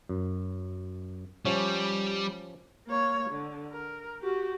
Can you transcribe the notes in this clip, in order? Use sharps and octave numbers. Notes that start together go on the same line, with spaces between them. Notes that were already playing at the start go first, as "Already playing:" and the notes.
F#2
F3 G3 C#4 C#5
A#3 C#5
D3
A#4
F#4 G4